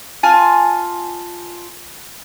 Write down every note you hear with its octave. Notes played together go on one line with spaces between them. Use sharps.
F4 G#5 A5